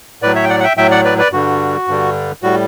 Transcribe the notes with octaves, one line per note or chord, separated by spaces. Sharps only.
A2 F#3 B4 D5
C#5 E5
G5
D5 F#5
F#5
E5 G5
A2 F#3 E5 G5
D5 F#5
B4 D5
B4 D5
G2 D3 G3 F#4
G2 D3 G3
A2 G3 F#4